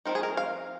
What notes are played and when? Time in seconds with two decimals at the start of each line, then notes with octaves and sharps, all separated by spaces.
0.05 F3 C4 D#4 A#4
0.15 G#4
0.23 A#4
0.37 F5